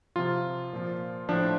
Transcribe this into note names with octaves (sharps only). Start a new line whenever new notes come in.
C3 F3 F4
A#2 F3
A2 F3 D4